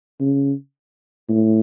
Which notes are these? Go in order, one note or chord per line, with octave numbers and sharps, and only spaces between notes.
C#3
A2